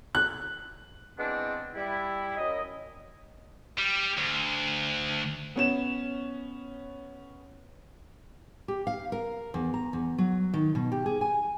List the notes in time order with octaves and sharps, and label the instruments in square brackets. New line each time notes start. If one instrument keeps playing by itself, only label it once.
[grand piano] F#6
[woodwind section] E3 G#3 B3 C4 D4
G3 E4
F#2 D#5
[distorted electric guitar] G3
D2
[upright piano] B3 C#4 E7
[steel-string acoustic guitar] G4
F5
A#4
E2
A#5
E2
F#3
D#3
B2
G4
G#4
G#5